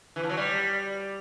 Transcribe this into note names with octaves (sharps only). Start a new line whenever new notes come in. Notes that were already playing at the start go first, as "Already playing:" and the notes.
E3
F3
F#3
G3